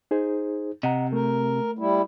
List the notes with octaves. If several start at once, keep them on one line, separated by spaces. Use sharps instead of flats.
D#4 G#4 C5
C3 D#5 F#5 A#5
A3 A#4
G3 E4